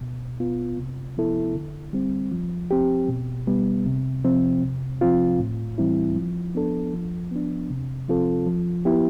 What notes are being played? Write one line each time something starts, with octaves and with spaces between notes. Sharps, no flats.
B2
B3 F4
C3
F3 B3 E4 A4
D3
G3 C4
F3
C4 G4
B2
G3 B3
C3
F3 C4
C3
F3 C4 F4
A2
E3 G3 C4 E4
F3
B3 D4 A4
F3
B3 D4
C3
F3 C4 F4 A4
F3
B3 E4 G4